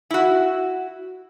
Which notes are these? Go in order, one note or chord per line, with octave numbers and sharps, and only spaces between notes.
E4 F#4